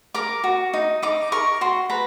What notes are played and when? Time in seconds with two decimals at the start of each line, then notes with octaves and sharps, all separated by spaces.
0.15 A#4 D6
0.44 F#4
0.74 D#4
1.02 D#4 D6
1.32 A#4 C#6
1.61 F#4 C6
1.90 B4 A#5